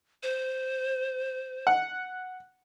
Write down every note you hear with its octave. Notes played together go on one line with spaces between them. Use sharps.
C5
F#5